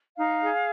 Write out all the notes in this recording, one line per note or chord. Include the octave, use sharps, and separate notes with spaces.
D#4 F5
G#4